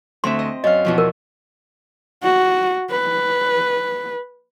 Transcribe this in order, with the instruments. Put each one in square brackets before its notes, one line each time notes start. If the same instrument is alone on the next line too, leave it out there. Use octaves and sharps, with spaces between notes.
[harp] D2 C4 E5 [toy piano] C6
[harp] D#5
[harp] F#2 F5 [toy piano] D#5
[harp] E2 B2 F3
[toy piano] A#4
[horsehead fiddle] F#4
B4